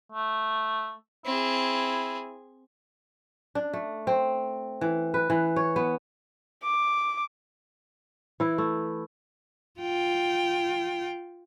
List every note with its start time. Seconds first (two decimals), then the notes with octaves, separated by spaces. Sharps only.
0.12 A3
1.26 C4 E4 G#4
3.55 D4
3.73 A3
4.07 C4
4.81 E3
5.14 B4
5.30 E3
5.56 C#5
5.76 B3
6.63 D6
8.40 E3 E4
8.58 A3
9.80 F4 G5